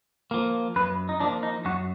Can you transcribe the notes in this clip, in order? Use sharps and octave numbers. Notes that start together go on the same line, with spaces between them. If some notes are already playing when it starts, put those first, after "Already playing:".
F3 A#3
F#2 B4
D#4
F3 A#3 D4
D#4
F#2 F#4